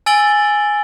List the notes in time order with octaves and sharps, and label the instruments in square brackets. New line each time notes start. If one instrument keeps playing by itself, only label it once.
[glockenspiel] G#5 E6 A6 D7 F#7 G7